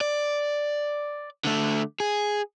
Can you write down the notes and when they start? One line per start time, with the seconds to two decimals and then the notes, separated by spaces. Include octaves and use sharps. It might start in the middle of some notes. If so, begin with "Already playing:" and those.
0.01 D5
1.45 D3 A3
2.00 G#4